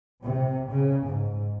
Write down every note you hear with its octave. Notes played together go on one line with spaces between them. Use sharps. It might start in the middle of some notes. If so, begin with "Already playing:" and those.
C3
C#3
G#2